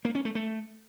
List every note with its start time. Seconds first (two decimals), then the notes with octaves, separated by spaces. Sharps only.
0.05 A#3
0.15 C#4
0.25 A3
0.35 A3